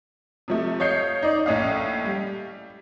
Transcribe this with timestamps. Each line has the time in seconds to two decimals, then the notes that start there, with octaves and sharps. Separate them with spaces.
0.48 C3 F3 A3
0.80 C#5 D#5 F5 G6 C7 C#7
1.23 D#4 D5
1.46 A#1 A2 C#4 D#5 F5
2.05 G3